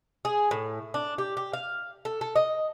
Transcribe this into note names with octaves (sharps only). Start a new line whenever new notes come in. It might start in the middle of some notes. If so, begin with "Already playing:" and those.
G#4
A2
D4
G4
G4
F5
A4
A4
D#5